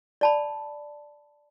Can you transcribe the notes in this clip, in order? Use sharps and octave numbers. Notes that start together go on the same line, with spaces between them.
D5 A5 B5